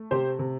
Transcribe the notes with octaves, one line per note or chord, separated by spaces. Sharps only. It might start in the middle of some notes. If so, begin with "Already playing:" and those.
Already playing: A3
C3 G4 C5
C3